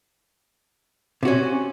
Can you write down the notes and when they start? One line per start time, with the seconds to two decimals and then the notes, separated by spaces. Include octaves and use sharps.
1.23 C3
1.25 F#4
1.28 C#4